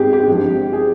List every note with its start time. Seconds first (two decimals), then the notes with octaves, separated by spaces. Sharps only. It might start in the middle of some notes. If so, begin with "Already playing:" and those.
Already playing: G#1 G#2 C4 G4 G#4
0.13 G4
0.27 G#1 G2 F3
0.73 G#4